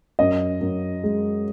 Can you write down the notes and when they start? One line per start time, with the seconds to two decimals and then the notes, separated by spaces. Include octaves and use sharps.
0.19 F#2 D#5
0.61 F#2
1.04 G#3